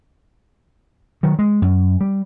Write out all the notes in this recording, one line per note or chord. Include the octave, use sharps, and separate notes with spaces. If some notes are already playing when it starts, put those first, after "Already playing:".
D#3 F#3
G#3
F#2
G3